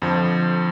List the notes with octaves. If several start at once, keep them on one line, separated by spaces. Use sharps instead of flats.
F2 D3 F3